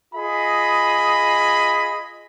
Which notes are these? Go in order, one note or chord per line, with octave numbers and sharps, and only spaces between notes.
F4 G#4 D#5 B5